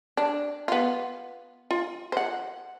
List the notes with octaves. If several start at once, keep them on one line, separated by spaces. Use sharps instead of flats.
D4
B3 F4
F4
C5 F#5